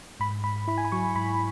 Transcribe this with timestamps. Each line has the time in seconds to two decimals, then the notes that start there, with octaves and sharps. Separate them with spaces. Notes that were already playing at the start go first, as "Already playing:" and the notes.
0.20 G#2 B5
0.44 G#2 B5
0.68 E4 B5
0.78 G#5
0.85 B5
0.92 F#3 C#6
1.15 G#2 B5